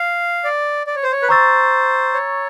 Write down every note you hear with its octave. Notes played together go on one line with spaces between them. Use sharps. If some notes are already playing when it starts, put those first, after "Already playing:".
Already playing: F5
D5
D5
C#5
C5
C#5
B4
C5 A#5 C#6 E6 A6
C#5